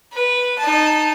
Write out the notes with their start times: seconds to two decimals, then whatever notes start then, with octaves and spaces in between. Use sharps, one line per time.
0.13 B4
0.59 D#4 A5